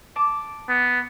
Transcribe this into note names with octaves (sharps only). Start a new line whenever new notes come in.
A5 D6
B3